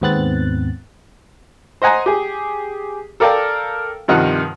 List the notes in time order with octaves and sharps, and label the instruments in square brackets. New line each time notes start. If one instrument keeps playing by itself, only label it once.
[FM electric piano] D#2 G#2 B3 C4 F#6 A6
[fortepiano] C5 D#5 F#5 G#5 A#5
G4 G#4
A4 A#4 D5 F5 G5 A5
G2 C3 D#3 F3 F#5 F6